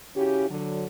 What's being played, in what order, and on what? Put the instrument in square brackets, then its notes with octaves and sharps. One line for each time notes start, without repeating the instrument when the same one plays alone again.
[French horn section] C#3 C#4 E4 F#4 G4
D3 F#3